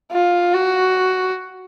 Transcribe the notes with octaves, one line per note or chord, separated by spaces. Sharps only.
F4
F#4